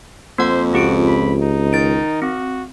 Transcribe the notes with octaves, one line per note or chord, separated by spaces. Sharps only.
F2 A#3 C5 F#5
C#2 C4 F#4 G4 D7
B5
D#4
D#3 A6 D7
C4 F#4